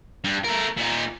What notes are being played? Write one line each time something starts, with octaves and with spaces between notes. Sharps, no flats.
G2
A3 A#4
A#2 D#4